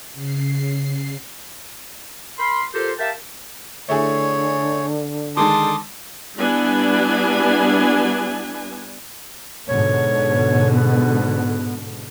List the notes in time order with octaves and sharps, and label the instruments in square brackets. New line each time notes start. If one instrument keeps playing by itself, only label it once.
[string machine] C#3 C7
[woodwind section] A#4 B5 C6
F4 G4 A4 A#4 C5
G4 A#4 E5 F5 G5 A5
[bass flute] D3 [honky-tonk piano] A3 E4 G#4 [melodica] C#5
[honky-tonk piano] D#3 G#3 [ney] A5 [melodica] C6 D6 D#6
[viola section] G3 B3 D4 E4 G#5
[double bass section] G#2 B2 D3 [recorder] C#5
[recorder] B3